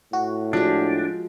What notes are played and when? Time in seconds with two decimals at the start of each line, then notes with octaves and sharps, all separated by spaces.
0.13 A2 F#4
0.53 F3 G#3 D4